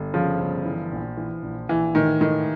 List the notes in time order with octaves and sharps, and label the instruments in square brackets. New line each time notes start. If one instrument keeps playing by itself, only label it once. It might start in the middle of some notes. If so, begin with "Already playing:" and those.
Already playing: [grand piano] G1
[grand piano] C#3 [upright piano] F3
[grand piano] G1
E3
A#1
E3
A#1
[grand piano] A#1 [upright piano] E3
[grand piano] A2 [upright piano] D#3
[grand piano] A2 [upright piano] D#3